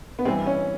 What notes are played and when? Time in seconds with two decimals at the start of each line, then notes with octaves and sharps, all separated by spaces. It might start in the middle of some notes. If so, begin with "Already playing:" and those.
0.19 B3
0.25 G2 E3 C4
0.46 C#4